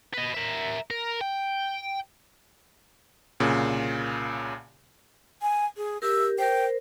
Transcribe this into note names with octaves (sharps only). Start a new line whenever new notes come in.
B4 D#5
A#4 E5
A#4
G5
C2 A#2 C#3
G#5
G#4
G4 A#4 E6
A#4 C5 G5